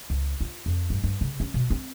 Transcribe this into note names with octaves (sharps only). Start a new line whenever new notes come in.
C#2
F4
F2
G2
G2
C#3
C#4
B2
C4